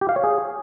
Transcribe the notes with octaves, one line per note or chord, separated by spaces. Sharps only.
G4
F5
C#5
G#4